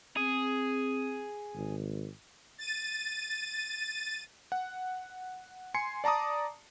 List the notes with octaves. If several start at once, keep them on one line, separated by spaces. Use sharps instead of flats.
C4 G#4
G#1
A6 D#7
F#5
G#5 C6 C7 C#7
D5 A5 A#5 D6 D#6